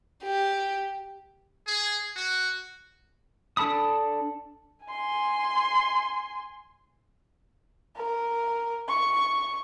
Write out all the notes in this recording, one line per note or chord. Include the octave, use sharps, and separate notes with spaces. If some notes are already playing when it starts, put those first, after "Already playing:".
G4
G#4
F#4
D4 A4 A5 B5 D#6
G#5 C6
A#4
C#6